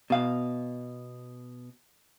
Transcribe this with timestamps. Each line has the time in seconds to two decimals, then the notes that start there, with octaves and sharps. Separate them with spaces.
0.10 B2 F5